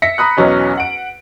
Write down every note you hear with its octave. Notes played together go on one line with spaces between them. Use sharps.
E5 A#6 B6 C#7
A#5 B5 D#6 F#6
B1 E2 F#3 C#4 D#5
F#5 D7